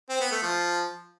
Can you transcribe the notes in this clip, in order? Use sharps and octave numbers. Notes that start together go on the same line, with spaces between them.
C4
B3
A3
F3